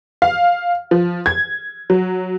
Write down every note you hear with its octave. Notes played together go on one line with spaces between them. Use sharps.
F5
F3
G#6
F#3